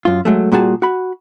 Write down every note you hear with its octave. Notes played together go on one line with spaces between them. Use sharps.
F#2 F4
F#3 G#3 A3
A#2 G3 F#4 G#4 A5
F#4 B5